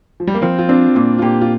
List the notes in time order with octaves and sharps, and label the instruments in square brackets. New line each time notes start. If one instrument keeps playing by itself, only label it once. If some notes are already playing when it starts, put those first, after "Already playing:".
[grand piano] F3
G3
A#3
[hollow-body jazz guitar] F3 [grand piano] C4
[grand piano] F4
[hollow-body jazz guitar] C4 [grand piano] D4
[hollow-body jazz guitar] A#2 [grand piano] F4
[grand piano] F4
[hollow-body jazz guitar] A#2 [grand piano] G4
[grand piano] F4